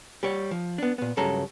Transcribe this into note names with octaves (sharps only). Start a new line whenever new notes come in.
G3 G4 C#5
F3
B3 D4
A#2 B3
C#2 G2 C#3 F#3 A4 A#5